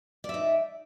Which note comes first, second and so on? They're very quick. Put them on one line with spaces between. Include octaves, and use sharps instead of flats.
D5 E5 D#4